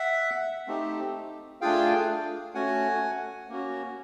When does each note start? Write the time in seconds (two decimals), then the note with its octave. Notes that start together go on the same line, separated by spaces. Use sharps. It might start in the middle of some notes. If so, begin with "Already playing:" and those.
Already playing: E5 F#5
0.67 A3 C4 D#4 G4
1.61 A3 D4 F4 G#4 F5 G5
2.55 A3 C#4 F#4 F#5 G#5
3.49 A#3 C#4 F#4